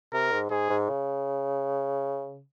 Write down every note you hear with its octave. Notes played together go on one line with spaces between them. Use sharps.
C3 A#4
G#2
G#2 G#4
G#2
C#3